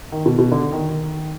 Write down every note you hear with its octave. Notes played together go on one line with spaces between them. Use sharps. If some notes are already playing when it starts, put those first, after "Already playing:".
D#3
B2
B2
D3
D#3